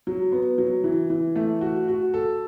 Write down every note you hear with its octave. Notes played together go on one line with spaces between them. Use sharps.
F#3
B3
F#3
E3
E3
A3
F#4
F#4
A4